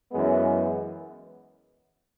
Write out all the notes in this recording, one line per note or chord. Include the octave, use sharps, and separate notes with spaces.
F#2 E3 G#3 B3